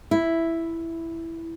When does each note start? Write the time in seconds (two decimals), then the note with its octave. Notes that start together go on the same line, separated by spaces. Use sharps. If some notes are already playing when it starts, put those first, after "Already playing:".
0.11 E4